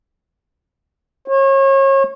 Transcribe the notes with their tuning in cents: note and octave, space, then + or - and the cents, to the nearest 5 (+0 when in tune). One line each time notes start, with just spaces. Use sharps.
C#5 -35